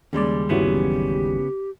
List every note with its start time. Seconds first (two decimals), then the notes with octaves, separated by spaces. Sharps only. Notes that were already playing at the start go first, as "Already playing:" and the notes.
0.13 D#2 C#3 G3 G#3 D5
0.49 G1 C#3 E3 F#3 B3 C#4 G4